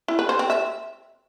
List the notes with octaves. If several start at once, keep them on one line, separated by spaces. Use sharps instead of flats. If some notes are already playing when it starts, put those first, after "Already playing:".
E4
B4
C5
C4
E5